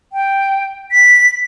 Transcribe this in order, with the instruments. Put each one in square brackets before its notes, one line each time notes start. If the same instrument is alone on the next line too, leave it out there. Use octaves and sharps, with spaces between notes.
[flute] G5
B6